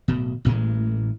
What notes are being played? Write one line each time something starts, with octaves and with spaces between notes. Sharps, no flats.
D1 B2
A1 A2 E3 G#3